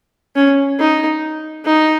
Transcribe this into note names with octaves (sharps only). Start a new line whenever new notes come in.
C#4
D#4
D#4